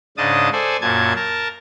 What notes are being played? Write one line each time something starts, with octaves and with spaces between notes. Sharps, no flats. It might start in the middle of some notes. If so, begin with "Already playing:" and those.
G#2 C#3 D4 D#5 A5 D#6
A4 C5 D5 G#5
F#2 A#2 A5 G#6
A#4 A5